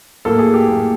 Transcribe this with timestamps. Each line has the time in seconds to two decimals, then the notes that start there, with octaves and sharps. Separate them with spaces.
0.25 A2 F#3 A#3 A4
0.39 G#4
0.54 G4
0.68 A2 F#3 A#3